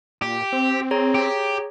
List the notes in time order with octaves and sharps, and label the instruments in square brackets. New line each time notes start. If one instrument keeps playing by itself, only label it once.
[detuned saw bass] A#2 [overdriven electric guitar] G4
[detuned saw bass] C4
[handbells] G#4 C#5 A#5
[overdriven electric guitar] G4